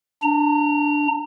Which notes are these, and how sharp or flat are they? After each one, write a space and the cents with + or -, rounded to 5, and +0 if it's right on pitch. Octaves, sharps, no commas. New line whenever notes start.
D4 +0 A#5 -30